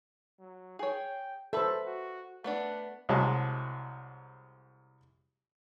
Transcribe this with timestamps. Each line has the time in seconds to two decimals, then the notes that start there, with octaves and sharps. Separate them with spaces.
0.39 F#3
0.79 G#4 C#5 G5
1.53 F#3 A4 B4 C5 E5
1.86 F#4
2.44 A3 B3 D4 F#5
3.09 C2 F#3 G#3 A5